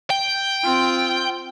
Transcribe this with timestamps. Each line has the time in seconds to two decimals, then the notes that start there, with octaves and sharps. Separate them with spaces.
0.10 G5
0.64 C4 F4